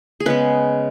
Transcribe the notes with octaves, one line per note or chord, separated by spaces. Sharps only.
G#4
C#3 G#3 B3 B4